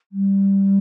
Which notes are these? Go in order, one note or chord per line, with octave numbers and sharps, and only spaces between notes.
G3